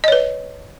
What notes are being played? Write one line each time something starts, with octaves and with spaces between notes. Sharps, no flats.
B4 C#5 D#5